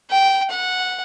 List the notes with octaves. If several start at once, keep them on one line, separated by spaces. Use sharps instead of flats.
G5
F#5